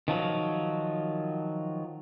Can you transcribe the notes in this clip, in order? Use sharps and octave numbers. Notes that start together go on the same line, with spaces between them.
D#3 F3 F#3